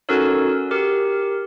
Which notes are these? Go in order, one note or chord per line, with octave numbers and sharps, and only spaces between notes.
C#4 D#4 F#4 A4 A#4 C#5
G4 A#4